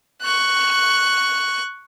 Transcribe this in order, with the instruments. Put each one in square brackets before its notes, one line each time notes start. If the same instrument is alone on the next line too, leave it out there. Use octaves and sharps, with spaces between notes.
[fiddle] C#6 F#6